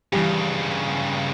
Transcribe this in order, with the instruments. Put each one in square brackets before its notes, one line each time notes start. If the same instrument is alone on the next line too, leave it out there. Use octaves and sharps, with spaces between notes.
[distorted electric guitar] G2 C#3 [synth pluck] E3 G3 G4